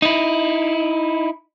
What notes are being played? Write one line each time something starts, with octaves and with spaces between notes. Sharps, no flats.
D#4 E4